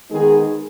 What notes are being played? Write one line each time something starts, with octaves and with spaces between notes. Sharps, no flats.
D#3 G#3 B3 D#4 G#4